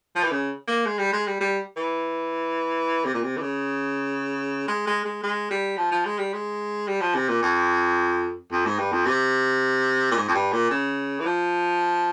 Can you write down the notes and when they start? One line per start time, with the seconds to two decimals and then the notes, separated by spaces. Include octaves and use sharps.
0.16 F3
0.23 E3
0.31 C#3
0.67 A#3
0.86 G#3
0.98 G3
1.13 G#3
1.27 G3
1.40 G3
1.77 E3
3.04 C3
3.14 A#2
3.23 C3
3.37 E3
3.41 C#3
4.68 G#3
4.87 G#3
5.05 G#3
5.23 G#3
5.51 G3
5.77 F3
5.91 F3
6.05 G#3
6.18 G3
6.33 G#3
6.88 G3
7.01 F3
7.15 C3
7.28 A#2
7.42 F2
8.51 F2
8.66 G#2
8.79 G2
8.92 F2
9.06 C3
10.11 A#2
10.16 G#2
10.28 F2
10.34 G2
10.53 A#2
10.70 C#3
11.20 E3
11.25 F3